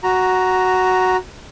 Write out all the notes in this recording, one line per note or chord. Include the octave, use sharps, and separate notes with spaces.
F#4 A#5